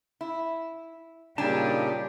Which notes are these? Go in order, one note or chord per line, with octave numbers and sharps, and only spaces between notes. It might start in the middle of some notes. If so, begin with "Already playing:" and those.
E4
A#2 C#3 G3 D4 D#4 G4 G#5 A5